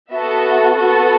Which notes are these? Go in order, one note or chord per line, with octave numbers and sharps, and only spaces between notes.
B3 F#4 A4 E5
B3 F#4 A4